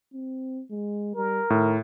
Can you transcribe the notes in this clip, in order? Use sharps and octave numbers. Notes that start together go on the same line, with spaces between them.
C4
G#3
G3 A#4
A2 D#3